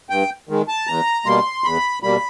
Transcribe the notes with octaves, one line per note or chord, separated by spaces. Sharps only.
G2 G5
D#3 G#3
A5
E2 A#5
B2 G3 A#3 C6
E2 B5
B2 G3 A#3 B5